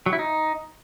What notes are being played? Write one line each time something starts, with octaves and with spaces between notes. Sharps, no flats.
F#3
E4
D#4